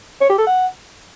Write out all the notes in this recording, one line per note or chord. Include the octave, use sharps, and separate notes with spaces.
C#5
G4
A4
F#5